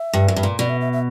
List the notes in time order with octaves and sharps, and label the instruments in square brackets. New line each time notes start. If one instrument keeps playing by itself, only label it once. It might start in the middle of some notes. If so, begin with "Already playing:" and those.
Already playing: [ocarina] E5
[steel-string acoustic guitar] G2
F#2
G2
A#2
[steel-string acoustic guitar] B2 [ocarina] D5
[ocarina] E5
E5
E5